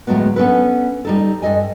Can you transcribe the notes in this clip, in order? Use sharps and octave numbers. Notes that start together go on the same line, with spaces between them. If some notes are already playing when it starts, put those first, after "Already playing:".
D2 A2 F#3 G#3 A3 B3
B3 C#4 D4 A4 B4
G3 D#4 A4
G2 A4 D#5 G#5